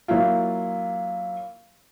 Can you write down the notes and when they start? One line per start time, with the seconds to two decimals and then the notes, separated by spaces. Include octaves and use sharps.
0.08 F#3 A#3 E4 F4